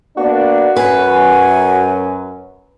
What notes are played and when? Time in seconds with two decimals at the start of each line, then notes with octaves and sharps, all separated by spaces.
0.17 A#3 B3 D4 F#4
0.76 F#2 B4 G#5